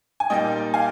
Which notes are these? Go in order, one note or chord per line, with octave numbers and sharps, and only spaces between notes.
G#5
A#2 G3 A#3 D#4 D#5 G5
F5 G#5